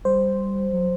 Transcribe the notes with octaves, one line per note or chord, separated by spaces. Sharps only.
G3 C5
F#3